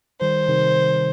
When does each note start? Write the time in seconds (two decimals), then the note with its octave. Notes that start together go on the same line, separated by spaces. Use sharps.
0.20 D#3 G3 C5
0.48 C3 D#3